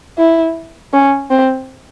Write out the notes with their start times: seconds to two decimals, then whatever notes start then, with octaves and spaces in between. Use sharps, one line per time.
0.18 E4
0.93 C#4
1.30 C4